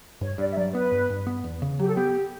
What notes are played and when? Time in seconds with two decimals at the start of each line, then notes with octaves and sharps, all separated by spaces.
0.21 G2 C#5
0.38 G2 D5
0.51 E5
0.56 F#3 D5
0.74 B3 B4
0.92 G2
1.10 G2
1.27 B3
1.44 E2
1.62 C#3
1.79 F#3 G4
1.88 A4
1.94 B3 G4